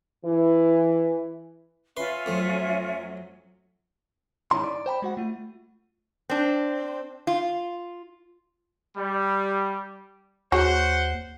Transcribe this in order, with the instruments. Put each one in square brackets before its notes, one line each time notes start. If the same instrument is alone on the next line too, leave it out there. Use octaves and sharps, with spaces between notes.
[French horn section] E3
[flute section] C#4 F4 E5 [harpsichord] B4 C6
[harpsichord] F2 A3 [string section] F#3
[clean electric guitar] G#2 D#3 C#4 E4 A#5 C6
D5
C5 G5 A#5 B5
G#3 F#4 F#5
A3 F4
[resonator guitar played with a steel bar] C4 D4
F4
[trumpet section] G3
[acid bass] D#2 [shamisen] F#4 G#4 C#5 [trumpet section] C5 F#5